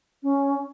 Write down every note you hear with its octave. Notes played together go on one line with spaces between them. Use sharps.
C#4